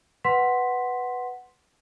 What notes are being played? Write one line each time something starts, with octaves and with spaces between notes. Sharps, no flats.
B4 F#5 C6 B6